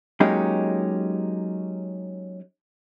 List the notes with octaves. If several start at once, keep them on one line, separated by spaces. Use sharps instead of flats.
F#3 G#3 A#3 C#4 D#4 G4